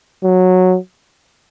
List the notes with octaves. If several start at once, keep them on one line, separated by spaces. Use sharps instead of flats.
F#3